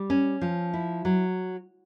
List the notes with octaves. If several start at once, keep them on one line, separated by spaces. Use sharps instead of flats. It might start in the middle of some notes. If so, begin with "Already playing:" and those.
Already playing: G3
C#4
F3
E4
F#3